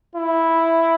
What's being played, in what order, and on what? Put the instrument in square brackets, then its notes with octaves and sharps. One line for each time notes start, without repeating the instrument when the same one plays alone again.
[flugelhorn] E4